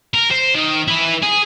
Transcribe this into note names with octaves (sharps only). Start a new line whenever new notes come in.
A#4
C5
D#3
E4 B4
G#4